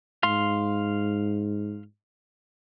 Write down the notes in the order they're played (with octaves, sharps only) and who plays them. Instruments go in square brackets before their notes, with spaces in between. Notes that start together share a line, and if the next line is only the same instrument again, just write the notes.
[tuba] G#2 [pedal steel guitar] F5 C6